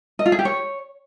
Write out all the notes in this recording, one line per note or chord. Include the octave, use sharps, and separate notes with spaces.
D#5
F4
G#4
G4
C#5